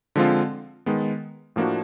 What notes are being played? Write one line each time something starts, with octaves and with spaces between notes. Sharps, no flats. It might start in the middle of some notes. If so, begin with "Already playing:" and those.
D3 F3 G#3 C4 F4
D#3 G#3 B3
A2 F3 A#3 D4 F#4